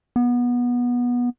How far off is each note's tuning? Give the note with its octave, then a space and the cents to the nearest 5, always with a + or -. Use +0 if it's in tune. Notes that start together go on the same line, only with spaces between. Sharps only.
B3 -20